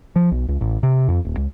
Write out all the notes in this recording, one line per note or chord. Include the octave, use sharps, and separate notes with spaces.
F3
B1
C#2
A1
C3
F2
D#1
C#2